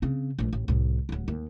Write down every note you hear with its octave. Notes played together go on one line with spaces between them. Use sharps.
C#3 C4
A#1 A3
A1
C2 A2
D1 F#3
D#2